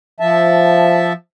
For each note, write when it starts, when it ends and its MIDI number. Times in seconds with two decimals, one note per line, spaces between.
0.20 1.13 53
0.20 1.13 76
0.20 1.13 81